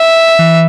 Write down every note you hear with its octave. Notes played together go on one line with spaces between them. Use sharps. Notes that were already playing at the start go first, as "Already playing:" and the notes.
Already playing: E5
E3